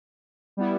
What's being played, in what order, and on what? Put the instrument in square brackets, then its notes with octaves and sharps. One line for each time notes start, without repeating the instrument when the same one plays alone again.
[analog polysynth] G3 B3 E4